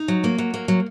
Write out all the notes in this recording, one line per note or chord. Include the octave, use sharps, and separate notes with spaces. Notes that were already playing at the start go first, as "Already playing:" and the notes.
Already playing: D#4
F#3
A#3
F#3
A#3
F#3